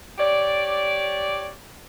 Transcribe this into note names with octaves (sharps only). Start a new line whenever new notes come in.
G4 C#5 D5